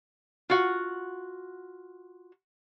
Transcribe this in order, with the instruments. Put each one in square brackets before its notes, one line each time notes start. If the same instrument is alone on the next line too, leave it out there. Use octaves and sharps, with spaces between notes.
[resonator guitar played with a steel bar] F4 F#4 F#5